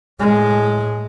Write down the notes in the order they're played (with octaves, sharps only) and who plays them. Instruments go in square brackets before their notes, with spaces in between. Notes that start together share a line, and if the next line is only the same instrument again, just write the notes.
[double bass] A2 G#3